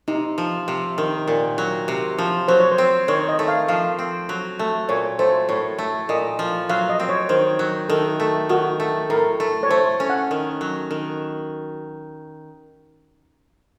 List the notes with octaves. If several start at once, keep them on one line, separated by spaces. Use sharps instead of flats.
C3 D#4
F3
C3
D#3
A#2
F#3
C3
F3
F#3 C5
C#5
C5
C4
D#3 C#5
D#5
A3
F5
F3 F5
C4
F#3
A3
A#2 C#5
A3 C5
A2 C#5
A3
A#2 D#5
F3
F#3 F5
D#5
C4
C#5
D#3 C5
F#3
D#3 A4
A3
D#3 F#4
A3
A2 A#4
A3
C#5
A3 C5
C#4
F#5
D#3
F#3
D#3